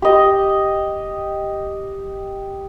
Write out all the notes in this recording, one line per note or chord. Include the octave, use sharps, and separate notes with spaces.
G4 D#5